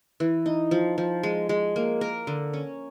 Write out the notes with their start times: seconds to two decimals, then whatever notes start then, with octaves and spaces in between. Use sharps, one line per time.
0.20 E3
0.46 D#4
0.71 F3
0.98 F3
1.23 G#3
1.49 G#3
1.76 A#3
2.01 A#4
2.27 D3
2.53 C#4